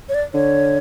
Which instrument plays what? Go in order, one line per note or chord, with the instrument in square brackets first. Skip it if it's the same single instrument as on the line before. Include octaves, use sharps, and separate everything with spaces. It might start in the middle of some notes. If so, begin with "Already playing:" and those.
[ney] C#5
D5
[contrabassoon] D3 [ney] C#5